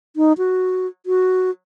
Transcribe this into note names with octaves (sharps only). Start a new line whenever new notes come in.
D#4
F#4
F#4